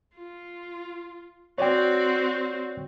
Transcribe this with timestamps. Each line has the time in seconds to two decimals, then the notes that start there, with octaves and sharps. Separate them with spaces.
0.15 F4
1.58 C4 F#4 C#5 D5 G5